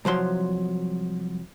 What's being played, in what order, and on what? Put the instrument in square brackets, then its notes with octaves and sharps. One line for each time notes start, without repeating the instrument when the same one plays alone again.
[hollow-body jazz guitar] C2 F3 F#3 C6